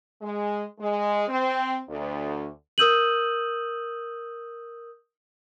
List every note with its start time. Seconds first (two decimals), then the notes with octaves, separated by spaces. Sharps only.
0.22 G#3
0.79 G#3
1.27 C4
1.89 D2
2.78 A#4 D#6 E6 G6 D#7 F#7